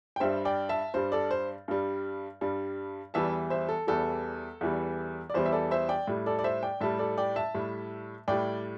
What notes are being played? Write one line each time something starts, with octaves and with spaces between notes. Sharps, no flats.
G5
G2 G3 C5 E5
D5 G5
E5 A5
G2 G3 C5
A4 D5
C5
G2 G3
G2 G3
E2 E3 G3 E5 A5
C5 E5
A4
E2 E3 G3 A4
E2 E3 G3
D5
E2 E3 G3 C5
E5
A4 D5
C5 E5
D5 G5
A2 G3
A4 D5
D5
C5 E5
D5 G5
A2 G3 E5 A5
A4 D5
D5 G5
E5 A5
A2 G3
A2 G3 D5 G5